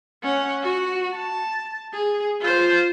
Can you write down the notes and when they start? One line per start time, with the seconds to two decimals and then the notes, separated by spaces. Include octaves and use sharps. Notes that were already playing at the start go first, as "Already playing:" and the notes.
0.22 C#4 F#5
0.62 F#4
1.14 A5
1.93 G#4
2.40 F4 C5